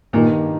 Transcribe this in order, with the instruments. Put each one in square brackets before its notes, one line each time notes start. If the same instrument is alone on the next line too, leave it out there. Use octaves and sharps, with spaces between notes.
[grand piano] G2 D#3 A#3 D#4 [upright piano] A#2